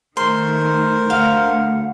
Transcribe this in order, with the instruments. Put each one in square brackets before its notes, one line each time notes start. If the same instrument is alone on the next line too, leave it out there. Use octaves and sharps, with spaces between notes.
[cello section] D#3 A3 [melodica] A#4 C5 [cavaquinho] C6
[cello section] D2 [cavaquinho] F5 [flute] F#5